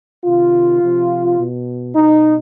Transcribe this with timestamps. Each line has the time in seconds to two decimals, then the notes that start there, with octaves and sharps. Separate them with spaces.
0.25 C3 D#3 F4
0.81 C3 F3
1.38 B2
1.95 B2 D#4